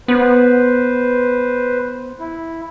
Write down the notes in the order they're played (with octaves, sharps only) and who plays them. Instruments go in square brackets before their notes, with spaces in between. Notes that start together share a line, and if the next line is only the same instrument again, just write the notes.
[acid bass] B3 [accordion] B4 C5
[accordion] E4